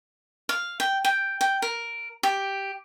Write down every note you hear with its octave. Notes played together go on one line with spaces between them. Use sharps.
F5
G5
G5
G5
A#4
G4